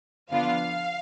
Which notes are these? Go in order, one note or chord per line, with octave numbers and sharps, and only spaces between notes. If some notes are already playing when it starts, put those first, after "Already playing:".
D3 F3 B3 D4 F4 F5